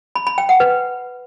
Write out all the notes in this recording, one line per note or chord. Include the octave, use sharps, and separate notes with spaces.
B5
B5
G5
F#5
B4